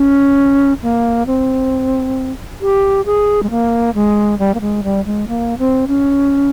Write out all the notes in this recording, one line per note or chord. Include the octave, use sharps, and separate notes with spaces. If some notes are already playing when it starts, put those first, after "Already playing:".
Already playing: C#4
A#3
C4
G4
G#4
G#3
A#3
G#3
G3
A#3
G#3
G3
G#3
A#3
C4
C#4